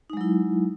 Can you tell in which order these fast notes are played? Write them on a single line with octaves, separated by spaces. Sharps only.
D#4 G#3 F#3 E4